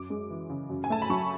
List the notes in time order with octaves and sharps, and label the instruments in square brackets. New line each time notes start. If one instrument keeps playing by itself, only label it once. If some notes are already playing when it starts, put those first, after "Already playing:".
Already playing: [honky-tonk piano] F#2 D6
G#3
E3
C#3
F#2
G#5
A3 A5
B5
F#3 C#6